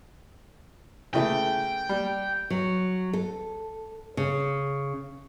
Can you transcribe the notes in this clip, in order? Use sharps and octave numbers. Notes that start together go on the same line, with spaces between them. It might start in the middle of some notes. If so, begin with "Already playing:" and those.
C#3 E3 A3 G5
G3
F#3
A4
C#3